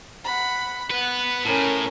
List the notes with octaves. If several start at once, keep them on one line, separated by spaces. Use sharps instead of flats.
F#5 B5
B3 B4 F#5
A2 C#4 A#4